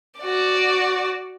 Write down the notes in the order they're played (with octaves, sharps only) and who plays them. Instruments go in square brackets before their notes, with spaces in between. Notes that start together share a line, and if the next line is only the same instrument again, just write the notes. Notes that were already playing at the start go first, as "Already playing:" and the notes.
[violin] F#4 D5